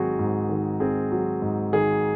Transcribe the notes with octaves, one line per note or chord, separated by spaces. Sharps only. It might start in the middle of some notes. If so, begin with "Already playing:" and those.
Already playing: G#2 D#3 F#3 C4 F#4 G#4
G#2
D#3
C4 G#4
F#3
G#2
D#3 G#4